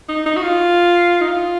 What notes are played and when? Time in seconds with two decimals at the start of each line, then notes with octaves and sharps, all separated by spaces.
0.09 D#4
0.26 D#4
0.37 F#4
0.43 F4
1.21 D#4
1.28 F4